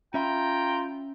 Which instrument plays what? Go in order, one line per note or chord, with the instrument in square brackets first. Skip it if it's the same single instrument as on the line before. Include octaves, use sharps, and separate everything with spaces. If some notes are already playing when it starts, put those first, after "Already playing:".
[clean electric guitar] C#4 E5 B5 [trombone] F4 [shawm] G5 [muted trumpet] A#5